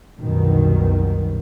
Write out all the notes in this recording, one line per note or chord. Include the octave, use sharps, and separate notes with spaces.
C2 F#2 B2 D#3